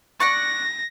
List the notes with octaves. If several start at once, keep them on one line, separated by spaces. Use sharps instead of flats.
D5 F#5 C#6 A#6